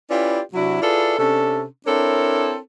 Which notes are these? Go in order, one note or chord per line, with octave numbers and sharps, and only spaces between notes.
C#4 E4 F4 G4 B4 D5
C3 F#3 D4 E4 F#4
E4 F4 G#4 A4 B4 D5
C3 C#4 D4 A4
C4 D4 E4 A4 A#4 C#5